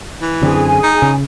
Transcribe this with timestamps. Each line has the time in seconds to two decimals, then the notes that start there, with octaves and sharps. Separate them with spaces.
0.22 E3
0.42 F#2 D3 C4 G#4 G#5
0.83 D#4
1.02 C#3